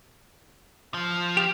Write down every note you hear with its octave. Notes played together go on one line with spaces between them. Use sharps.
F3
G4